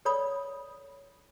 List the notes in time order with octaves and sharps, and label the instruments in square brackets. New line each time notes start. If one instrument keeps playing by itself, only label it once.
[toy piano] A4 C#5 D5 B5 D#6